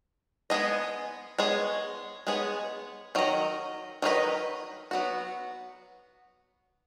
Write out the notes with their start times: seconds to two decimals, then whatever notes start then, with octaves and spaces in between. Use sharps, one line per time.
0.50 G#3 B3 G#4 D#5
1.38 G#3 B3 G#4 C#5
2.27 G#3 B3 G#4 C#5
3.15 D#3 F#3 D#5
4.02 D#3 F#3 C#4 B4 D#5
4.91 F#3 B3 F#4